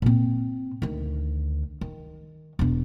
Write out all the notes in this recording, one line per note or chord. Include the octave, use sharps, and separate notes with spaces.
A#2 C4
D2 D#3
D#3
E1 D4